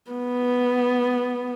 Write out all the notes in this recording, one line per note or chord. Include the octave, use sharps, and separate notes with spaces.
B3